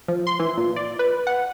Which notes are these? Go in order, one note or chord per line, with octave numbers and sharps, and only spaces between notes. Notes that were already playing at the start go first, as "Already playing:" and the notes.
F3
C6
E3
A#2
D5
B4
F#5